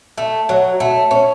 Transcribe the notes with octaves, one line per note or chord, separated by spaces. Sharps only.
A3
F#3
A3
C#4